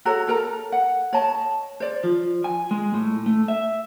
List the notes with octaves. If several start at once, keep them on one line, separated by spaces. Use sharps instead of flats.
F#4 A4 C#5 A#5
A4 A#4 A#5
F#5
C#5 D#5 A5
C5 D5
F3
G#5
G#3
A2
A3
E5